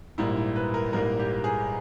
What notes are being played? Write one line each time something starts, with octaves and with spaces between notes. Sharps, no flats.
A#1 G#2 G3 A#3 E4
E4
B4
A#4
A#1 G#2 G3 A#3 A#4
G4
G#4